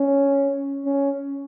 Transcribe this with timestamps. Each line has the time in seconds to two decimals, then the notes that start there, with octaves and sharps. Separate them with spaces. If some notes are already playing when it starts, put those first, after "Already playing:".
Already playing: C#4
0.86 C#4